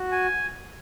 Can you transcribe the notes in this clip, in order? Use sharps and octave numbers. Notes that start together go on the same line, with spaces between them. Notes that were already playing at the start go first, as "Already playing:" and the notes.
Already playing: F#4
G#5